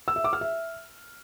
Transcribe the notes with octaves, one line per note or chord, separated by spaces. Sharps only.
E6
E5
D6
F6
E5